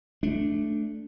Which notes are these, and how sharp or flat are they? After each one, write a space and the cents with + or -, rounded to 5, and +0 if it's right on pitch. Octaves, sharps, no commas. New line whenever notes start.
A3 +0 D4 +0